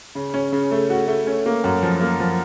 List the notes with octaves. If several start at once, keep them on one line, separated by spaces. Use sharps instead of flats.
C#3
C#4
C#3
A3
F#4
A3
C#4
A#3
F#2
F3
A#3
F3